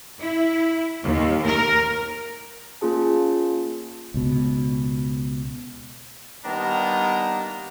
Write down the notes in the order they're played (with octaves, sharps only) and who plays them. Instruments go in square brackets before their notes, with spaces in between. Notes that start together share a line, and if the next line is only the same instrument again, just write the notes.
[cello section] E4
D#2
A#4
[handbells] A#3 C#4 F4 G#4 A5
[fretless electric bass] C#2 B2
[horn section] D#3 G3 A#3 B3 D4 A#5